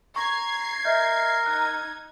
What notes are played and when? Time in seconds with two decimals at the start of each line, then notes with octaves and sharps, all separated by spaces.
0.16 A#5 C#6 G#6 C7
0.84 A#4 D#5 E5 G6
1.46 D#4 F#6 G#6